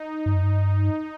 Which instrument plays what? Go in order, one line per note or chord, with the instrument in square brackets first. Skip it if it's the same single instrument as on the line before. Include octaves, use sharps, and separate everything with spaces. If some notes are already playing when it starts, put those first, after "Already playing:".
Already playing: [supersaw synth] D#4
[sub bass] G2
F#2
G2